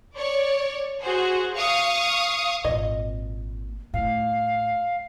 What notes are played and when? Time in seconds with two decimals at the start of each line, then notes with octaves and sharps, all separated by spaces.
0.15 C#5 D5
1.02 F#4 G#4 C5
1.56 F5 C#6 D#6
2.65 G#1 A#2 D#5
3.94 A2 F5